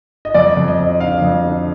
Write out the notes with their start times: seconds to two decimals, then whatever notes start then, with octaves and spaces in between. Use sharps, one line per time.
0.25 D#5
0.34 F2 D5
0.57 F2
0.68 D#5
0.79 F2
1.00 D3 F5
1.22 F2
1.44 D3